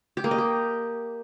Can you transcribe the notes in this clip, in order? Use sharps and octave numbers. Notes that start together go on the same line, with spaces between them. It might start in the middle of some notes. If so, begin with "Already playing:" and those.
G4
A#3
D#5
G4